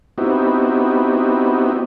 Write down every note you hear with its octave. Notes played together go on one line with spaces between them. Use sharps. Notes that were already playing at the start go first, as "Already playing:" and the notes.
B3 C4 D#4 E4 F#4 G4